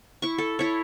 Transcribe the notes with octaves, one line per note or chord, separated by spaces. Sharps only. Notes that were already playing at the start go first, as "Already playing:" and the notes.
E4 C#6
A4
E4 C#5